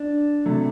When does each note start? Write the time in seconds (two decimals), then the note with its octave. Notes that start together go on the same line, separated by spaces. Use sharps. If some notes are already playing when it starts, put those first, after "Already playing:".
Already playing: D4
0.46 C3 F#3 A3